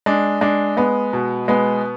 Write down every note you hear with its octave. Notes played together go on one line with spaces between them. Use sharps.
G#3 D4
G#3 D4
G#3 B3
B2
G#3 B3